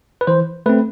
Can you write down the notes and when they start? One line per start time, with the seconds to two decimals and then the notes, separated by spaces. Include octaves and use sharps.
0.21 B4
0.27 E3 C5
0.66 A3 C4 B4